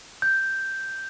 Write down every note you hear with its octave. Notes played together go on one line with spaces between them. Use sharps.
G6